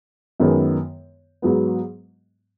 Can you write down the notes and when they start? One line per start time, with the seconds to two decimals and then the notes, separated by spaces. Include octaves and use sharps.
0.40 F#2 D#3 G#3 B3
1.42 G#2 F#3 B3